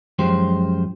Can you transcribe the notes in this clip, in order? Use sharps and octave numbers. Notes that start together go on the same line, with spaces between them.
F#2 F3 G#3 G4 C5